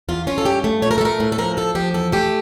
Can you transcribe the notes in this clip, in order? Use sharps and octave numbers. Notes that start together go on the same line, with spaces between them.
E2 F4
C#4 F4
A4
G2 G4
A3
A#2 C#5
A#4
A4
A3 A#4
A2
A4
F3 A#4
D2 A4
F3 G4
E2 A4
A3 G4